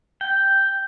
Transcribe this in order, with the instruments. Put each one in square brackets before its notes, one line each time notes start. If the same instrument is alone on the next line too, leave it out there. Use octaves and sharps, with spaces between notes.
[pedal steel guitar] G5